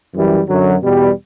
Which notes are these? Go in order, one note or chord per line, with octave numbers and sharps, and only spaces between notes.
F#2 E3 G3
F#2 D3 F#3
E2 B2 G3